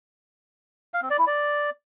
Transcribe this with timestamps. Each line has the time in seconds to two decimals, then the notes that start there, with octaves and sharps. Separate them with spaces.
0.94 F5
1.02 C4
1.10 D5
1.19 E4
1.27 D5